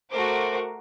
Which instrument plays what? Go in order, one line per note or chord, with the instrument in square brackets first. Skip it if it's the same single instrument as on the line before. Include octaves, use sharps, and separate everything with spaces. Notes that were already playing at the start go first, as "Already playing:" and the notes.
[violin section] A3 F#4 A#4 C5 D6